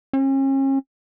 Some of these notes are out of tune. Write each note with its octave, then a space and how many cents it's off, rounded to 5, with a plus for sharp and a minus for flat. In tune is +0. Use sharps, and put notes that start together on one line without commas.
C#4 -40